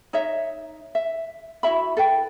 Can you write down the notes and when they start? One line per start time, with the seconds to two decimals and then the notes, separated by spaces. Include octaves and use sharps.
0.13 D#4 C#5 D#5 E5
0.95 E5
1.63 E4 F#4 E5 B5
1.97 A4 B4 G5